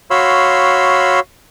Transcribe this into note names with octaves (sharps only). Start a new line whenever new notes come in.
F#4 C#5 F5 B5 C6 E6